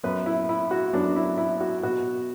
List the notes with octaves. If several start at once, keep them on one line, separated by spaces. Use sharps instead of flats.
F#2 F#3 B3 B4
E4
E4
F#4
F#2 F#3 B3 D4
E4
E4
F#4
B2 B3 F#4